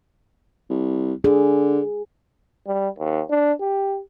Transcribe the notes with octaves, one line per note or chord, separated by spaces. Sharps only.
C2
D3 G#4
G3
D#2
D4
G4